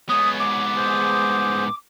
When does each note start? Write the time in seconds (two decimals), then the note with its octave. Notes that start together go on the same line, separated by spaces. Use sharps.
0.09 G#2 B3 C#5 D#6
0.40 D6
0.76 G#4 C5